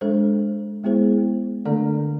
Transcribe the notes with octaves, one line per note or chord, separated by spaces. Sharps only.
G#3 D4 A4 C5
G#3 B3 E4 G#4 C5
D3 A3 D4 A4 D5